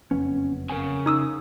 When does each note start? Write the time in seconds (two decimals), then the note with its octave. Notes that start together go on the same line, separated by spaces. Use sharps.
0.11 F#1 F2 B3 C#4
0.70 C#3 A#4 F#5 G#5
1.06 D#4 D#6 E6